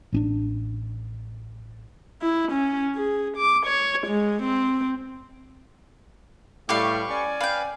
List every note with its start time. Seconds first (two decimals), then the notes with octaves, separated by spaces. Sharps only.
0.13 A1 C4 D4
2.22 E4
2.52 C#4
2.96 G#4
3.37 D6
3.66 C#5
4.07 G#3
4.42 C4
6.69 A2 G3 G4 B4 F5 C#6
7.10 C#4 D5 G#5
7.41 B4 F5 G5